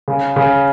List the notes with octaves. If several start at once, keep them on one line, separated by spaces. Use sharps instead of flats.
C#3
C#3